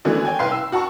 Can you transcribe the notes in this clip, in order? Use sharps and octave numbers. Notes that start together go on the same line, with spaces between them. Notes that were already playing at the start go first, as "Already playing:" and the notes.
E3 G#3 A3 B3 D4 F#4
C#5 G5 G#5
C2 B4 F5 G5 C6 C7
E6
F#4 F#5 A5 A#5 C#6